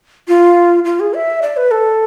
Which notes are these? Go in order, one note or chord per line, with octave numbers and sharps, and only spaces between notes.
F4
F4
G#4
E5
D5
B4
A4